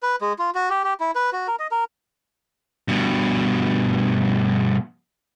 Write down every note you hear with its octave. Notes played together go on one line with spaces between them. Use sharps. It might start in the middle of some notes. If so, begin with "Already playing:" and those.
B4
G#3
F4
F#4
G4
G4
E4
B4
F#4
A#4
D#5
A#4
G2 B2